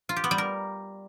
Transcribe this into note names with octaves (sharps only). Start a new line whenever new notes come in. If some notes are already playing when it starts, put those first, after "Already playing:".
F4
G4
B3
G3
A#4